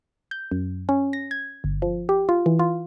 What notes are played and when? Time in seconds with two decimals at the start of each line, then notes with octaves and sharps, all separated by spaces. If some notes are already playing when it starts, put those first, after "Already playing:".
0.31 G6
0.51 F#2
0.89 C#4
1.13 A#6
1.31 G#6
1.64 G1
1.82 F3
2.09 G4
2.29 F4
2.46 E3
2.59 F4